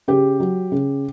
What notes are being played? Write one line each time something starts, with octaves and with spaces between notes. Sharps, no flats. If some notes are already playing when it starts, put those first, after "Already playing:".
C#3 G4
F#3
C#3